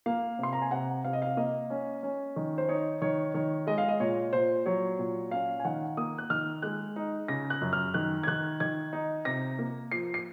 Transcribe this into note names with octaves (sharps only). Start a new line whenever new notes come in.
A#3 F5
C3 C6
A#5
G#5
C3 F#5
C3 F5
D#5
F5
A#3 D#5
C#4
C#4
D#3
C5
D#4 C#5
D#3 C#5
D#3 C#5
G#3 D#5
F5
D#5
A#2 C#5
A#2 C5
F#3 C#5
A#2
C#4 F5
G#5
D#3 F#5
A#3 D#6
F#6
D#3 F6
G#3 F#6
D#4
C#3 A#6
F#6
F#2
F6
D#3 F#6
G#6
D#3 F#6
D#3 G#6
D#4
C3 A#6
A#3
F3 C7
C7